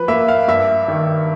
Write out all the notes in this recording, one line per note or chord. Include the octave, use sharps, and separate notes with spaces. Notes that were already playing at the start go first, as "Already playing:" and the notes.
Already playing: F3 B4
A#3 E5
F5
G2 E5
D#3